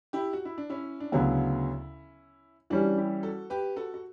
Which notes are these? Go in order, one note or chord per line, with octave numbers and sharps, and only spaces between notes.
E4 G4
F#4
E4
D4
C#4 E4
D4
D2 C#3 F#3 B3 C#4 E4
E3 G3 C#4 D4 F#4
E4 G4
F#4 A4
G4 B4
F#4 A4
F#4